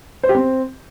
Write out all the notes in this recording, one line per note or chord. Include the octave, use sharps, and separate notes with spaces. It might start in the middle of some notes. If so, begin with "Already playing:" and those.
C5
G4
C4